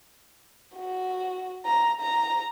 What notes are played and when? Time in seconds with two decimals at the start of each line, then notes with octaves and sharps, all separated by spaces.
0.77 F#4
1.66 A#5
2.01 A#5